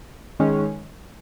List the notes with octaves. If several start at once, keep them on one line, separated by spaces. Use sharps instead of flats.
D#3 G#3 C#4